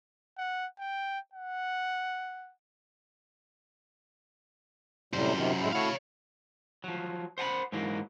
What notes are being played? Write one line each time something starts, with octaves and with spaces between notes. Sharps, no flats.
F#5
G5
F#5
F#2 A2 C3 G3 C5
C3 D#3 F4
A2 G#3 E4
A3 E4 F#4 C#5 F5
F3 F#3
C5 F#5 G#5 B5
G#2 E3 F#3 A#3